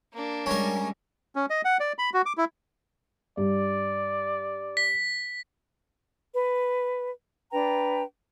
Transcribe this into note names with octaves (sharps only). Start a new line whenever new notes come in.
A#3 D4
G3 G#3 C#4 A#4
C#4
D#5
F#5
D5
B5
F#4
D6
E4
G2 D5
B6
B4
D4 B4 G5 A#5